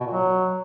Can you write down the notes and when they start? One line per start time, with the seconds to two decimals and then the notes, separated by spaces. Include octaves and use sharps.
0.01 B2
0.06 A#2
0.12 F#3